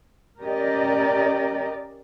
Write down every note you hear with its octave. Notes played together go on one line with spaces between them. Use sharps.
C#4 G4 A#4 D5 D#5